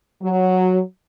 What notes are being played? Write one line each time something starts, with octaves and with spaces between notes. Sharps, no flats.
F#3